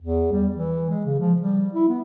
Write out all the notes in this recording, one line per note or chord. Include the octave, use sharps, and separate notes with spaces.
E2
G3
E3
G#3
C#3
F3
G3
E4
B3